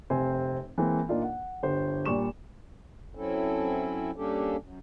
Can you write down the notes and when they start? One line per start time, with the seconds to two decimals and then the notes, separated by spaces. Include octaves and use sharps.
0.10 F1 C3 C4 C5 G#5
0.78 E3 G#3 A#3 C4
1.09 A#2 A#3 D4 D#4 F4
1.23 F#5
1.63 G1 G4 C5
2.05 A#2 G3 C#6 E7
3.15 F#3 C4 C#4 E4 A4
4.16 G3 A#3 C#4 D4 G4 A4
4.59 F#2